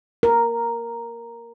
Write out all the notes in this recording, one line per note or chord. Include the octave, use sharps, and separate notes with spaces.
A#4